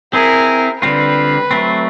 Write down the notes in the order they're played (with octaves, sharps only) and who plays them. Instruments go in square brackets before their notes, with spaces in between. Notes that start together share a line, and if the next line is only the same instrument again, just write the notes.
[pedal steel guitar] C4 E4 G#4 [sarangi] A#4
[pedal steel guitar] D3 G3 C4 F4 [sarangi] B4
[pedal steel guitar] F#3 A3 C4